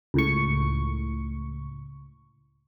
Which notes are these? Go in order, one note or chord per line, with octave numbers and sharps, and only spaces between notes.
C#2 A2 C#6